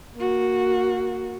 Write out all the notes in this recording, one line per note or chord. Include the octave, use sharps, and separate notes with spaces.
A#3 F#4